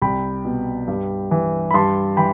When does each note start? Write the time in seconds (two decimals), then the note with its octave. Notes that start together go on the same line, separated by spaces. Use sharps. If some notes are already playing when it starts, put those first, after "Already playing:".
0.02 C2 G5 B5
0.45 B2
0.88 G2
1.31 E3
1.71 B5
1.74 G2 A5 C6
2.17 E3 G5 B5